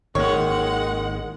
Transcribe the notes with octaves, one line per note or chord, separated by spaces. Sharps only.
G#1 D#3 G#3 A#3 C#5 F#5